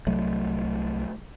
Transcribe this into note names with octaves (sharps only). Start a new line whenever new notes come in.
C2 F#3 A3